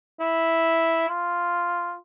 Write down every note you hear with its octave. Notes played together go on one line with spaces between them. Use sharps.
E4
F4